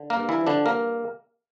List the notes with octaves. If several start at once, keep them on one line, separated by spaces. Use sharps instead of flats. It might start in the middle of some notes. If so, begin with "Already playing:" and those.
Already playing: D3
A#3 A#4
G2
E3 E4
F3
D3 D4
G2 A#3 A#4